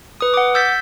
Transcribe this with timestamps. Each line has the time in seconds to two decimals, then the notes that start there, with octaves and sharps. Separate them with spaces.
0.21 B4 D#6
0.34 F#5 D6
0.55 E6 G6 A6 B6